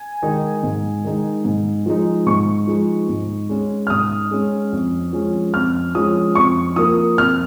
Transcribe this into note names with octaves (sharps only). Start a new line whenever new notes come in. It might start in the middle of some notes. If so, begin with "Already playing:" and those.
Already playing: G#5
D#3 G#3 D#4
G#2
D#3 G#3 D#4
G#2
F3 G#3 D#4
G#2 C#6
F3 G#3 D#4
G#2
G#3 C#4
F6
G#2 D#6
G#3 C#4
F2
F3 G#3 C#4
F2 F6
F3 G#3 C#4 D#6
F2 C#6
F3 A#3 D#6
F2 F6